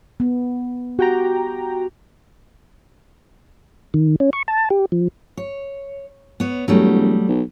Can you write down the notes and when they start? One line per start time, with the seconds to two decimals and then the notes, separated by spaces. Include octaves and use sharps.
0.20 B3
0.99 F#4 G4 G5 A#5
3.94 D#3
4.20 C#4
4.33 C#6
4.48 A5
4.70 G4
4.92 F3
5.37 C#5
6.40 B3 C#5
6.68 E1 F#3 G3 A3
7.29 B1